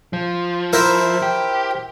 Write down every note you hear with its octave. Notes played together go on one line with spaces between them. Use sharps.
F3
E4 A#4 C5
G4